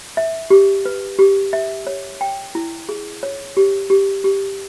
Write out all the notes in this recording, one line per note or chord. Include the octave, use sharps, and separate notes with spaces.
E5
G4
B4
G4
E5
C#5
G5
E4
G#4
C#5
G4
G4
G4